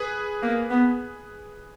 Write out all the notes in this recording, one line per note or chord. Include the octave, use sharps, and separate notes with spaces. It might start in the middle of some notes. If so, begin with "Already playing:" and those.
Already playing: G#4 B4
A#3
B3